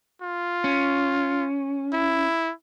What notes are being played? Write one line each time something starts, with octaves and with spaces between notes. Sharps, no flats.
F4
C#4
E4